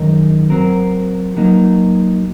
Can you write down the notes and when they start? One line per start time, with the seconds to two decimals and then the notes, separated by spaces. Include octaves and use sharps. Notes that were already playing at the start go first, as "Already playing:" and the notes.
Already playing: F#2 D#3 G#3 D#4 A#4
0.50 F#3 C4 F#4 A#4
1.37 F#3 A#3 D#4